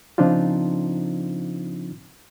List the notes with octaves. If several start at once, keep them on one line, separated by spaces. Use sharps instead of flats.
C#3 F3 C4 D4 D#4 F4